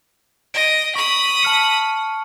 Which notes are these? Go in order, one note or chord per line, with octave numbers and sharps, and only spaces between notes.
D#5 D7
B5 C#6 D#6
A5 F6 C#7